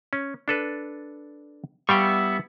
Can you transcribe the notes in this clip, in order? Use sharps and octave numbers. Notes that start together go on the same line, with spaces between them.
C#4
D4 A4 B4
G3 B3 E4 F5 G5 C#6